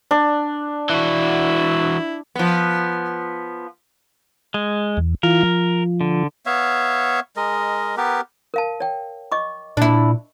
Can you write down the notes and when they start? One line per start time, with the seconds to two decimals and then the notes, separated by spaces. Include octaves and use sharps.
0.11 D4
0.90 E3 E4 F#4
2.35 F3 B3
4.54 G#3
4.97 E2
5.23 E3 F4 A#4
5.43 F3
6.01 D3
6.46 B3 C#5 E5 F5
7.36 G#3 A#4 D#5
7.97 B3 G4 A#4 B4
8.54 A#4 F5 A5
8.80 C#5 G5
9.32 D#5 C#6 D6
9.77 A#2 D4 E4